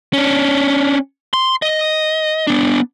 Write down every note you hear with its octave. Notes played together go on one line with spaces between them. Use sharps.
C#4 D4
C6
D#5
B3 D4